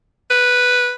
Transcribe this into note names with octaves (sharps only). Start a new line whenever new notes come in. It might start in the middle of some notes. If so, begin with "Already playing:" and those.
B4